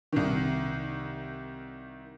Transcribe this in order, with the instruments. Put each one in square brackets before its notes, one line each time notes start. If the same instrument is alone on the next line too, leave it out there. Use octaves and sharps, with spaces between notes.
[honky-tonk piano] C2 D#3